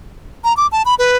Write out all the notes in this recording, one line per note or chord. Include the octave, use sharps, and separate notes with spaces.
A#5
D6
A5
B5
B4